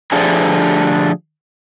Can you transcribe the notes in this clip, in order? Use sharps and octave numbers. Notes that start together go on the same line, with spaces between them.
D3 F3 A3 D4 G4 G#4